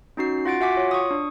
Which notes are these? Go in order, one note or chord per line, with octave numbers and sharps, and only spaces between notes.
C#4 D#4 F#4 C7
F4 F#5 A6 D7
F#4 E5 F#5 G#5 D6 B6
F4 C#5
C#6 D#6
D4